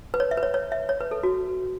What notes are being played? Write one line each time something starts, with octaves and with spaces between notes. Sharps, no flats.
B4
C#5
E5
B4
C#5
C#5
E5
C#5
B4
A4
F#4